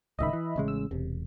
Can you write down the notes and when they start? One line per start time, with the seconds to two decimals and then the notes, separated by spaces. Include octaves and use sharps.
0.19 D1 C#2 D#3 D#5 E5 B5
0.33 E3
0.56 A1 C#3 G#3
0.68 E6
0.91 E1 C3